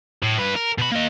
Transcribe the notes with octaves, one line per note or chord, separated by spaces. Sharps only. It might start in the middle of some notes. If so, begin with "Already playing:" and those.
A2
G2 B4
A#4
B2 B5
A#3 D#5